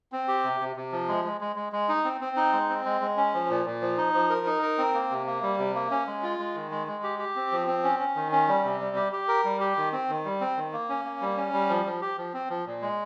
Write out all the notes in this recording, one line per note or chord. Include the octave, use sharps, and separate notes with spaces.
C4
G4
C3
C3
C3
F3
G#3
G#3
G#3
G#3
G#3
D#4
C4
C4
D#4
G#3
C4
G#3
G#3
C#4
F3
A#2
A#2
F3
D#4
F3
A#4
D#4
A#4
C4
A#3
C3
A#3
G3
C3
A#3
C#4
G#3
F4
G#3
D#3
G#3
G#3
G4
G4
C4
F3
C4
C#4
C#4
D#3
C#4
G3
C3
G3
G4
G4
A#4
G3
G4
D#3
C4
D#3
G3
C4
D#3
A#3
C#4
A#3
G3
C#4
G3
F3
F3
G4
F3
C4
F3
A#2
G#3